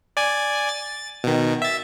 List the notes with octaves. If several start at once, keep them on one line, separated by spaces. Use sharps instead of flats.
D5 G#5
A6
B2 D#3
E5 A6